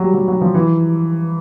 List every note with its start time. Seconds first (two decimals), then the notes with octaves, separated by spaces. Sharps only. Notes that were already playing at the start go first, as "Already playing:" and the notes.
Already playing: F#3 G3
0.14 F#3
0.28 F#3
0.42 F3
0.54 E3